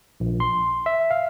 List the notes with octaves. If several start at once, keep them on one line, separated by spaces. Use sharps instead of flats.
A#1
C6
E5
F5